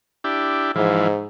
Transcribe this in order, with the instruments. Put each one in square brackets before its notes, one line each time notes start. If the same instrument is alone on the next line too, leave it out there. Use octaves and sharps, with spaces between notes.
[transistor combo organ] D4 E4 G4
[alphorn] G#2 [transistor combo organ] E3 F3